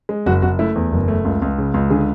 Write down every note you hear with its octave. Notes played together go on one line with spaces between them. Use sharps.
G#3
F#1 F#4
F#1 F#4
A3 E4
E2
F#1
A3
C#2
C#2
C#3
C#2
D3 G#4